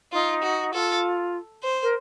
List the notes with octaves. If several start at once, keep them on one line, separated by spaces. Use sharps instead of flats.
D#4 F4
F#4
F4 A4
C5
A#4